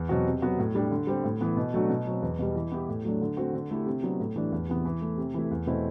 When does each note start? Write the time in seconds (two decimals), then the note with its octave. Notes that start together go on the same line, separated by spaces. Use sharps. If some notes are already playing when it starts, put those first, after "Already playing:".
Already playing: E2
0.09 B2 F#3 C4 F#4
0.26 C3
0.42 F#3 B3 F#4
0.59 A2
0.75 G3 D4 G4
0.91 D3
1.07 G3 C4 G4
1.24 A2
1.41 E3 B3
1.57 B2
1.74 F#3 A3 D4 F#4
1.89 B2
2.07 F#3 C4
2.22 E2
2.39 B2 G3
2.56 E3
2.72 B3 E4 G4
2.89 A2
3.05 F#3 A3 D4
3.21 D3
3.37 A3 C4 F#4
3.53 D3
3.71 A3 E4 G4
3.86 C3
4.03 F#3 B3 D4
4.20 A2
4.36 E3 A3 D4 G4
4.52 E2
4.68 C3 E3 B3
4.85 E3
5.02 A3 E4
5.17 C3
5.34 E3 A3 E4
5.51 E2
5.67 B2 A3 C4 E4